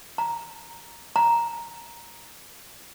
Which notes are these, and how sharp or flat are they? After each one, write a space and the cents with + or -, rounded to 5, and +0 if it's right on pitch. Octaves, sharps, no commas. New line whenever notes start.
A#5 -5
A#5 +0